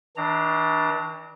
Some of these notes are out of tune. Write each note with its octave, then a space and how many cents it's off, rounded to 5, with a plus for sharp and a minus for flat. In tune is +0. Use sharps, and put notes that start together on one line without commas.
E3 -45 D4 +10 A#5 -25